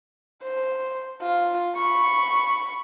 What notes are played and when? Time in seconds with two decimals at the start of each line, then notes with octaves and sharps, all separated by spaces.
0.43 C5
1.22 F4
1.76 B5 C#6